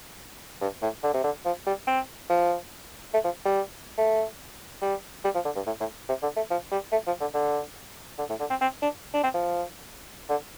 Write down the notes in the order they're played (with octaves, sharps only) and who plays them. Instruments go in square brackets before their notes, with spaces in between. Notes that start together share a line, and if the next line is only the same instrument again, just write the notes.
[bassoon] G2
A2
D3
C3
D3
F3
G3
C4
F3
A3
F3
G3
A3
G3
G3
F3
D3
G2
A2
A2
C3
D3
A3
F3
G3
A3
F3
D3
D3
D3
A2
D3
C4
C4
D4
D4
C4
F3
D3